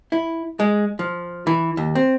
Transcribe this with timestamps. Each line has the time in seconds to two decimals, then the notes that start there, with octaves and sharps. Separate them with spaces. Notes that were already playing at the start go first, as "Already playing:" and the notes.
0.12 E4
0.60 G#3
0.99 F3
1.47 E3
1.77 D#2
1.95 C4